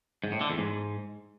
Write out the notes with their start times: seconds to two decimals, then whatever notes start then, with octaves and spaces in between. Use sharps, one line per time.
0.24 G#2
0.32 A2
0.41 D3
0.49 E2
0.58 G#2